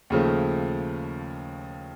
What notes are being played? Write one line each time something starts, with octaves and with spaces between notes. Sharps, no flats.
D#2 C#3 F3 A3